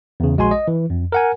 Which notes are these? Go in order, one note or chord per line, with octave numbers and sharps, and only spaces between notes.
E2 C#3
A#1 G#3 F#4 G#5 C6
D#5
E3
F2
A#4 F#5 G#5